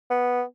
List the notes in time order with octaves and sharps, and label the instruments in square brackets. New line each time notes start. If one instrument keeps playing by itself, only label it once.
[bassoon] B3